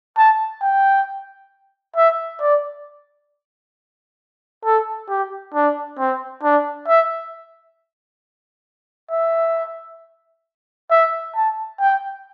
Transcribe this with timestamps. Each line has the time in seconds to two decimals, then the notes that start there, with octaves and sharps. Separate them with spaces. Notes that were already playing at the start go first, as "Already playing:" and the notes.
0.17 A5
0.62 G5
1.96 E5
2.41 D5
4.65 A4
5.09 G4
5.54 D4
5.99 C4
6.43 D4
6.88 E5
9.11 E5
10.91 E5
11.35 A5
11.80 G5